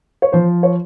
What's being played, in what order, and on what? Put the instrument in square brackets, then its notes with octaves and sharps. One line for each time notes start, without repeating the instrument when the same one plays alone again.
[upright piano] C#5
[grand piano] F3 [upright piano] C5
[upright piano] C#5